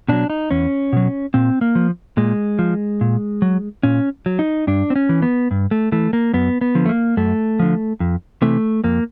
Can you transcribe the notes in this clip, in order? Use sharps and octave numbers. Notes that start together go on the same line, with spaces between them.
B2 F#3 D4
D#4
E2 C#4
B2 F#3
A#2 C4
A#3
F3
A#2 G#3
F3
A#2
F#3
A#2 C#4
F#3
D#4
G2 D4
C4
C#4
E3
B3
G2
A3
E3 A3
A#3
F#2 B3
B3
D3 F3
A3
A#3
F#2 A3
D3 F3
F2
C3 E3 A3
F2 A#3